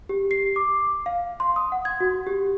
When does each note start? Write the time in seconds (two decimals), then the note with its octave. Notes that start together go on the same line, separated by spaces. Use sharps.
0.09 G4
0.31 C7
0.56 D6
1.06 F5
1.40 C6
1.56 D#6
1.72 F#5
1.85 G#6
2.00 F#4
2.27 G4